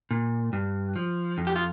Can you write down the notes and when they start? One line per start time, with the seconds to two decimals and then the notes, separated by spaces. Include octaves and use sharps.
0.11 A#2
0.53 G2
0.96 F3
1.38 F2
1.47 G4
1.56 F4